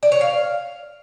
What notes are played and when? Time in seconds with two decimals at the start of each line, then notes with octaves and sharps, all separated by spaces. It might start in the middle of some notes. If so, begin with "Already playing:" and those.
0.03 D5
0.12 C#5
0.21 F5